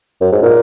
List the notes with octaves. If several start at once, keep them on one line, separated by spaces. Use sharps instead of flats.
F#2
G#2
A#2